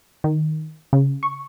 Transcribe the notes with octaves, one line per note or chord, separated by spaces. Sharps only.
D#3
C#3
C#6